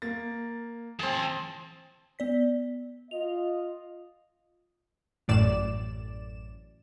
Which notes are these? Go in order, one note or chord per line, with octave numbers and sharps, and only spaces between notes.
A#3 A6
E3 C4 G#4 A5
B3 D5 B6
F4 D#5 F7
A1 F#2 A2 D5 E7